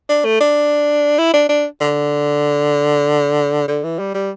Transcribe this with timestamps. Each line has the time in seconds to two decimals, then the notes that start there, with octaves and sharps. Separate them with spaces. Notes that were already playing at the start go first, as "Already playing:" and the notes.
0.09 D4
0.25 A3
0.40 D4
1.18 E4
1.33 D4
1.49 D4
1.81 D3
3.68 D3
3.83 E3
3.99 G3
4.14 G3